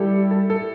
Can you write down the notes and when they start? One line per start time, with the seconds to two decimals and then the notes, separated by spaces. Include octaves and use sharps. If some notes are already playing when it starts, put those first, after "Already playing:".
Already playing: G3 E4 G4 A4
0.31 A4
0.50 A4